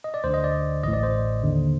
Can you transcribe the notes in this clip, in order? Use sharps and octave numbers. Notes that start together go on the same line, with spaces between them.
D#5
D5
D2 D3 C5
D#5
D5
A1 A2 D#5
D5
C5
D#2 D3